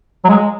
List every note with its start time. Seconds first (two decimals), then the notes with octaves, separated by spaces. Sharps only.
0.24 F#3
0.29 G#3